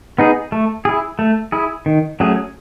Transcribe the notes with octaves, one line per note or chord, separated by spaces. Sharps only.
B3 D#4 G#4
A3
E4 G#4
A3
E4 G#4
D#3
F#3 A3 C#4 G#4